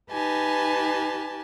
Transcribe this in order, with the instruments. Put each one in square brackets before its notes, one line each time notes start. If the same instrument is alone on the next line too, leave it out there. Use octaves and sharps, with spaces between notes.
[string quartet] D#4 G4 B4 G#5 A5